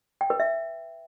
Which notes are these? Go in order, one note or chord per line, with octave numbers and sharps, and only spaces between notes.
G5
B4
E5